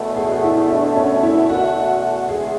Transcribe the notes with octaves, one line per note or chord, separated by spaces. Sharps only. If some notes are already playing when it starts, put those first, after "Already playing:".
Already playing: E2 B2 A3
G#4
F#4
E4
D4
C#4
E4
F#4
E2 G#3 G#4